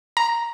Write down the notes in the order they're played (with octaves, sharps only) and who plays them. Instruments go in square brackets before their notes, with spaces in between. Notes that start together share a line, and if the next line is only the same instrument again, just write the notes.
[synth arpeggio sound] A#5